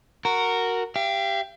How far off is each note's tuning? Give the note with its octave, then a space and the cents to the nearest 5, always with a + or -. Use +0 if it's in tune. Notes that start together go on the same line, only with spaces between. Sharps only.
F#4 +0 A#4 -10
G4 +5 F5 -40